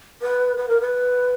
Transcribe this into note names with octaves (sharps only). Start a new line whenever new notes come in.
B4
B4
A#4
B4